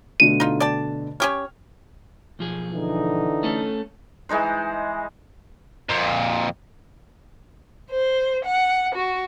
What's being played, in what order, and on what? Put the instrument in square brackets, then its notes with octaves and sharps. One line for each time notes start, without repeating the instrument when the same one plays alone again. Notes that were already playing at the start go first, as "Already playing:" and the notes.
[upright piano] B2 D3 A3 [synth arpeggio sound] D#7
[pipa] D#4 F4
D5 G5 A5
[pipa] C#4 G4 C#5 [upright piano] F6
[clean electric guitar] B1 F3 G#4
[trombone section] D3 E3 D#4
[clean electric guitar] A3 C#4 A4
[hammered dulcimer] E3 G#3 D#4 C5
[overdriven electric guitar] F2 A#2
[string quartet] C5
F#5
F#4